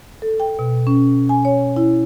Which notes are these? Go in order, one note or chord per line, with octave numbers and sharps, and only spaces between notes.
A4
G5
B2
C#4
G#5
C#5
E4